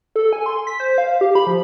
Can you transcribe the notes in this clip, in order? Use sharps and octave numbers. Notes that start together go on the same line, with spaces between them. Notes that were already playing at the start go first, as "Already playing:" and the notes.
A4
G#5
C6
B6
C5
F5
G4
B5
F3